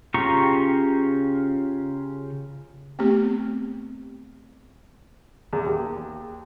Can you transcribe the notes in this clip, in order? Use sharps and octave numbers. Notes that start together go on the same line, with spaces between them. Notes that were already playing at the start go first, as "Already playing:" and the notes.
C#3 F4 G4 A#5 C#6
A3 B3 C4 G4
E2
D#2